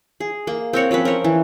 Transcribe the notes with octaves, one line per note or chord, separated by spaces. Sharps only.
G#4
A#3
C4 A#4 C#5 F#5
F3 C4 C#4 B4
A#4 C#5
E3